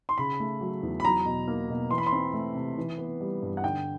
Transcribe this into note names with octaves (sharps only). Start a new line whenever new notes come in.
C6
C#3 B5
A3
F#3
E2
B5
F#3 A#5
B2
A#3
B2
E3 C6
B5
C6
C4
A3
C3
E3
B3
G3
G2
F#5
D3 G5